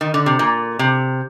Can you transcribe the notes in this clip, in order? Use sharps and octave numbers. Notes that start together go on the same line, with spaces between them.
D#3
D3
C3
A#2
C3